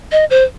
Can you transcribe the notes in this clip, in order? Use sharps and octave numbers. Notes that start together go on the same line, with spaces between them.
D#5
C5